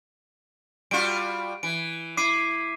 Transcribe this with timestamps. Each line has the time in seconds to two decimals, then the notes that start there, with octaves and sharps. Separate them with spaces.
0.91 G3 F4 F#4 D7
1.63 E3 D7
2.17 E4 D6 C7 D#7